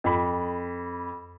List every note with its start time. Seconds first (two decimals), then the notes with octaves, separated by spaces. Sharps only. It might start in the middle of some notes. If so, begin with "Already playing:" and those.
0.04 F2 B5